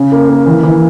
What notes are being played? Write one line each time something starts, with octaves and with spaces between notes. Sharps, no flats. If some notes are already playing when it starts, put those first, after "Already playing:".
Already playing: C#3
A#3
A#3
E3
E3